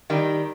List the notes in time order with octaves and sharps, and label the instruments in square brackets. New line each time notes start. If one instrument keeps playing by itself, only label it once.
[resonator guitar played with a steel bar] D#3 G3